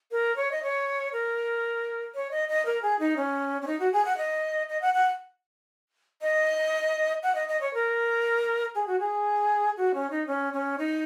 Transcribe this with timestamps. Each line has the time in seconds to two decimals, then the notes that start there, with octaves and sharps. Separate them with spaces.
0.12 A#4
0.36 C#5
0.52 D#5
0.63 C#5
1.13 A#4
2.15 C#5
2.31 D#5
2.49 D#5
2.66 A#4
2.82 G#4
2.99 D#4
3.17 C#4
3.62 C#4
3.67 D#4
3.80 F#4
3.93 G#4
4.05 F#5
4.18 D#5
4.69 D#5
4.82 F#5
4.94 F#5
6.22 D#5
7.23 F#5
7.35 D#5
7.48 D#5
7.61 C#5
7.74 A#4
8.75 G#4
8.87 F#4
9.00 G#4
9.77 F#4
9.94 C#4
10.11 D#4
10.27 C#4
10.53 C#4
10.78 D#4